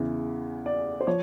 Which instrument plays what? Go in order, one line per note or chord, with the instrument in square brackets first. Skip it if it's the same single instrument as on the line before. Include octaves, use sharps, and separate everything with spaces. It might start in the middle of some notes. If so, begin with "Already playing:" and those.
Already playing: [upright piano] E2 C#3 E3
D5
C5
F3 C#5